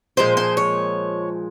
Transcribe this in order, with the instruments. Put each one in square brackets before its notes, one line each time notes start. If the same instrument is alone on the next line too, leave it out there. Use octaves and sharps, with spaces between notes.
[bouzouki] A#2 F3 G#3 C5
C5
C#5